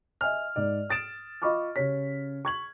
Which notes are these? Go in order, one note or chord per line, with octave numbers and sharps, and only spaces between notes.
D#5 E5 G#5 F6
G#2 D5
D#6 A6 D7 E7
F4 D#5 B5 C#6 D6 F6
C#3 C#4 G4 C#5 B6
C#6 G#6 F#7